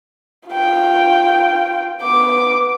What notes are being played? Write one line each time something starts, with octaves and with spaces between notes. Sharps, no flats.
F4 G5
B3 D6